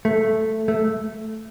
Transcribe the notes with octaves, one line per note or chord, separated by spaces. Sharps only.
A3
A3